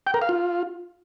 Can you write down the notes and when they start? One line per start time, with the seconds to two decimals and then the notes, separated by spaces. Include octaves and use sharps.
0.07 G5
0.14 A#4
0.22 F5
0.29 F4